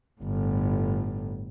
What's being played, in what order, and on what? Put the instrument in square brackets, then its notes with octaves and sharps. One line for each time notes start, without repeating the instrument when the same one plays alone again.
[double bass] G1 A2